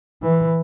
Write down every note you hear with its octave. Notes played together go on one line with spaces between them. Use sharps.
E3